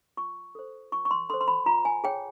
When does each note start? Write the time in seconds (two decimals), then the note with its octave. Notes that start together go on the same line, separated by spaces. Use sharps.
0.17 F4 C#6
0.55 A4 C5
0.92 F4 C#6
1.05 C#6
1.11 C6
1.30 A4 C5 C6
1.41 C6
1.48 B5
1.66 F4 A#5
1.85 G#5
2.04 G#4 C#5 G5